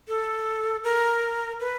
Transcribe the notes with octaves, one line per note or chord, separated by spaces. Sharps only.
A4
A#4
B4